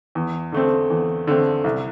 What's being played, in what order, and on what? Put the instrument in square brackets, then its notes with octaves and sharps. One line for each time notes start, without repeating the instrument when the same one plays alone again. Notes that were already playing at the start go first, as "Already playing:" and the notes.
[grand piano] E2
D3 A3 C4
E2
D3 A3 C4
C2